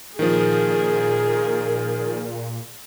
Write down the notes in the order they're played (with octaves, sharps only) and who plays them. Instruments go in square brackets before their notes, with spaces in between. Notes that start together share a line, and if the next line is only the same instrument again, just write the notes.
[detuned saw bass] A#2 [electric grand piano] D#3 F3 [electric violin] G#4 [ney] A#4